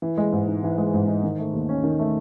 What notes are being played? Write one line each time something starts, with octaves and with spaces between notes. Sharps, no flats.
E3
G#3
G#2
D#4
E3
G#3
G#2
D#4
D#3
A3
D#2
C#4
D#3
A3